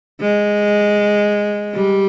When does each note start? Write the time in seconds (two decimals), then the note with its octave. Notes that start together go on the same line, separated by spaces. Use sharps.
0.21 G#3
1.75 G3